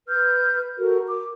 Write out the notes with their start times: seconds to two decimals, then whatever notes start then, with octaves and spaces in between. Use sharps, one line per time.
0.08 B4 F6 G6
0.79 F#4 A4 A#4
1.07 D6